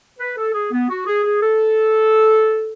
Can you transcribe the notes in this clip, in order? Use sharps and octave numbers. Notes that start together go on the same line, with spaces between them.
B4
A4
G#4
B3
F#4
G#4
G#4
A4